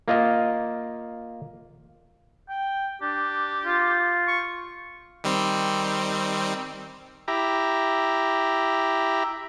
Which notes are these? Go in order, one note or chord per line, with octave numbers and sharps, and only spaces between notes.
A#3 F4 D#5 F5
G5
D4 G4
F4
C#6
D#3 G3 C4
E4 G4 A#5